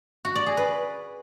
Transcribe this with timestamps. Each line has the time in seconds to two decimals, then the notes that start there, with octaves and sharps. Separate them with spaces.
0.25 F#4
0.35 D5
0.46 G#4
0.57 B4